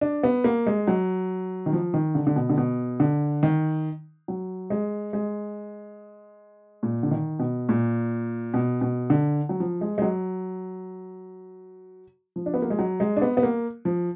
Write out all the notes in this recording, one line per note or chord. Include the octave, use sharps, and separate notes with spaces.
D4
B3
A#3
G#3
F#3
D#3
F3
D#3
D3
D3
B2
D3
B2
D3
D#3
F#3
G#3
G#3
A#2
D3
D#3
B2
A#2
B2
B2
D3
F#3
F3
G#3
G#3
F#3
F3
D4
B3
A#3
G#3
F#3
G#3
D4
B3
B3
A#3
F3